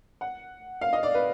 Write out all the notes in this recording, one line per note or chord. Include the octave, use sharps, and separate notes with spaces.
F#5
F5
D#5
D5
B4